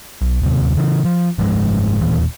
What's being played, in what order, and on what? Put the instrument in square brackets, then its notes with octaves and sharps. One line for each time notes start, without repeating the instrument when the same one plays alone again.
[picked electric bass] B1
D1 D#2 C3
C#3 E3
F3
F#1 G#2 F3 G#3
E1 D#2 A#2 E3